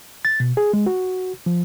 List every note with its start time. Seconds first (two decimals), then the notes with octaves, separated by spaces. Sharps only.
0.25 A6
0.40 B2
0.57 G#4
0.74 G#3
0.86 F#4
1.46 F3